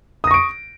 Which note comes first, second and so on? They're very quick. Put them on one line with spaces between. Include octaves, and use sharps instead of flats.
D#6 A#6 C#6 D7